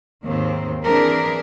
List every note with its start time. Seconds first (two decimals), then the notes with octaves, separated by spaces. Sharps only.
0.24 D#2 G#2 D#3 C4
0.84 E3 C4 D4 G#4 A#4 B4